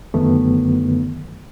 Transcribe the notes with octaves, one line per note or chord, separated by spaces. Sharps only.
F#2 D3 D#3 F#3 A3 B3